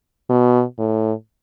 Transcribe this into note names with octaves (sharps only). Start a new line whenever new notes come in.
B2
A2